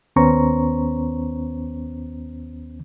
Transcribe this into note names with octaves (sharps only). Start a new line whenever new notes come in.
D#2 B3 C#4 C5 A#5 C#6